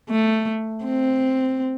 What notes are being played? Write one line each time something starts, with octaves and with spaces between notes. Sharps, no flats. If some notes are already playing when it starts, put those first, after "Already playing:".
A3
C4